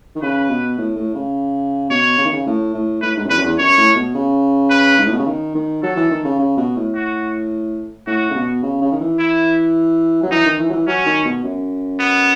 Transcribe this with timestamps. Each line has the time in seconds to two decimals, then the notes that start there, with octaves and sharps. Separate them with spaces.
0.15 D#3
0.22 C#3 B4
0.50 B2
0.78 A2
0.96 A2
1.15 C#3
1.90 B2 C#5
2.18 C#3
2.25 D#3
2.33 C#3
2.46 A2
2.74 A2
3.02 A2 B4
3.17 G#2
3.24 F#2
3.30 E2 B4
3.37 F#2
3.44 E2
3.58 F#2 C#5
3.77 A2
3.95 B2
4.15 C#3
4.70 B4
4.98 G#2
5.05 A2
5.12 B2
5.19 C#3
5.26 D#3
5.55 D#3
5.83 F#3 A4
5.96 E3
6.11 D#3
6.25 C#3
6.38 C#3
6.57 B2
6.76 A2
6.95 F#4
8.07 A2 F#4
8.31 C#3
8.35 B2
8.63 C#3
8.81 C#3
8.92 D#3
9.01 E3
9.19 E4
10.23 F#3
10.31 E3 D#4
10.45 D#3
10.59 E3
10.69 F#3
10.73 E3
10.87 F#3 C#4
11.06 D#3
11.25 B2
11.43 F#2
11.99 B3